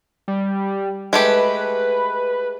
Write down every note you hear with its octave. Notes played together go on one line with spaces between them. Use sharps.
G3
G#3 A3 G4 B4